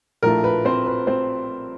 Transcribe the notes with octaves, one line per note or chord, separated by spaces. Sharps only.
A#1 A2 F3 A3 A#4
B4
C4 C5
B4
C4 C5